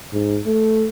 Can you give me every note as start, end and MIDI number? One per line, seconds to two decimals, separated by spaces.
0.13 0.40 44
0.46 0.88 57